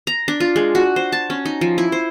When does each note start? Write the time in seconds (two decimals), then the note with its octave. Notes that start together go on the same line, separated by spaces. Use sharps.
0.07 A#5
0.28 D4
0.40 F4
0.56 G#3
0.75 F#4
0.96 C5
1.12 A5
1.30 C#4
1.46 D#4
1.61 F3
1.78 E4
1.92 C5